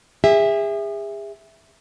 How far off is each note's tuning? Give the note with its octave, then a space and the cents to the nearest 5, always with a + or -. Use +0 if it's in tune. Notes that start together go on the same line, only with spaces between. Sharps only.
G#4 -35 E5 +0